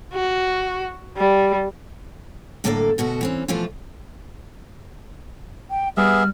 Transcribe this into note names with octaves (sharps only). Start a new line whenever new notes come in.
F#4
G3
A2 D3 A#3 A4 C5 F5
D2 B2 F#4 A4
E3 C4 C#4
B2 E3 F3 A3 E4 F4
G5
G3 B3 G#4 E5 F6